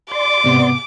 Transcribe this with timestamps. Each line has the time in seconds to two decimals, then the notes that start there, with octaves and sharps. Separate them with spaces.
0.12 D5 C6 D6
0.44 G#2 C3 B3